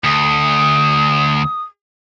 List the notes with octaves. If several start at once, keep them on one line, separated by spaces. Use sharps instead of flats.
D2 D#6